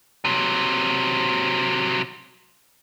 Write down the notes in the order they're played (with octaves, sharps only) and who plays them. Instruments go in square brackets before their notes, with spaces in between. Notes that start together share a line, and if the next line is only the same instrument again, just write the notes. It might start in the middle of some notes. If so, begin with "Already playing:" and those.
[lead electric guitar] C3 F#3